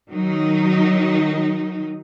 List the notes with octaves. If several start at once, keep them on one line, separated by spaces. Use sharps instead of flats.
D#3 F#3 D#4